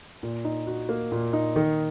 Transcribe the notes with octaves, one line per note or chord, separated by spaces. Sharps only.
A#2
D#4
F#4
A#3
A#2
D#4
D#3